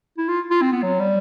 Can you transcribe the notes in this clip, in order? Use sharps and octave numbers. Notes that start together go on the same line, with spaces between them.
E4
F4
F4
C4
B3
F#3
G3